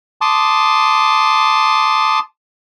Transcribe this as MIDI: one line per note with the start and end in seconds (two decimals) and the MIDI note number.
0.21 2.19 81
0.21 2.19 84
0.21 2.19 86
0.21 2.19 87